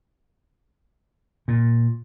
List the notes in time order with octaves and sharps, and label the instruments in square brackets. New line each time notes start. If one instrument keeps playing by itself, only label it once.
[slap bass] A#2